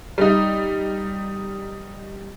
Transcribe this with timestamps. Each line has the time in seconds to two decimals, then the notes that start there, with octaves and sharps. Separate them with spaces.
0.18 G3 D#4